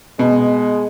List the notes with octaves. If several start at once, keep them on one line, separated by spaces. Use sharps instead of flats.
B2 G#3